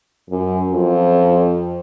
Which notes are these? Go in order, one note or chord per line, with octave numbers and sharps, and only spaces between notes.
F#2
F2